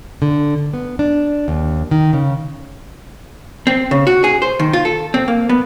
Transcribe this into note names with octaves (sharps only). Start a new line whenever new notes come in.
D3
B3
D4
D#2
D#3
C#3
C4
C#3
F#4
G#4
C5
D#3
F4
A4
C4
A#3
B3